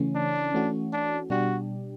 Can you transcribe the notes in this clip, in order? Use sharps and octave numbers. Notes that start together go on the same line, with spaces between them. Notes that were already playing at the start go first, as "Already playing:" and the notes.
Already playing: C#3 E3 A3 C#4
D4
E3 A3 C#4 F#4
D4
B2 G3 D4 F#4 G4